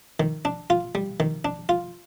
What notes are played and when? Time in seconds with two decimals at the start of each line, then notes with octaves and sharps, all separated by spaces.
0.20 D#3
0.45 D4
0.70 F4
0.95 G3
1.20 D#3
1.45 D4
1.69 F4